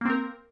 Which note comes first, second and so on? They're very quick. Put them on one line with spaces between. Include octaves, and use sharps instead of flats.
A#3 C4 A#4